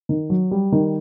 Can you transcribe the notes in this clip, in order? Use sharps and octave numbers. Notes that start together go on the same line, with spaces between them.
D#3
F#3
G3
D#3